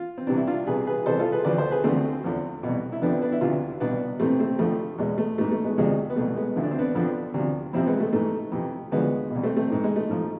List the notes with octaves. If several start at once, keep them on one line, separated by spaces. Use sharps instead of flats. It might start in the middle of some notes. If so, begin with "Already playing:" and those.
Already playing: F4
C4
C2 C3 E3 D4
E4
D4 F4
C2 C3 E3 G#4 B4
G#4 B4
C2 C3 E3 A4 C5
F4 A4
G#4 B4
D2 D3 F3 B4 D5
A4 C5
G#4 B4
D2 D3 F3 A3 C4
E2 D3 F3
C2 B2
E4
F2 D3 F3 B3 D4
B3 D4
E4
D2 C3 E3 D4 F4
C2 B2 B3 D4
F2 C3 E3 A3 C4
A3 C4
F2 D3 F3 A3
E2 B2 G#3
A3
G#2 E3 A3
A3
G#3 B3
D2 C3 F3 G#3
B3
C2 B2 A3
G#3 B3
D2 D3 F3 E4
D4
C4
B3 D4
F2 D3 F3 B3 D4
D2 C3 F3
F2 C3 F3 C4 E4
G#3 B3
A3
G#2 E3 A3
F2 C3 E3
D2 D3 F3 G#3 B3
C2 B2
A3 C4
A3 C4
G#2 E3
G#3
A3
G#2 F3